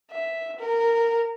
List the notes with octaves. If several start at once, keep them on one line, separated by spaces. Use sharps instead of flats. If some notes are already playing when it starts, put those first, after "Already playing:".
E5
A#4